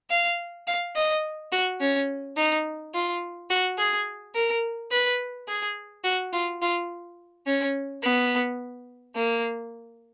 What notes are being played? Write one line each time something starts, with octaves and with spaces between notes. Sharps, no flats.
F5
F5
D#5
F#4
C#4
D#4
F4
F#4
G#4
A#4
B4
G#4
F#4
F4
F4
C#4
B3
A#3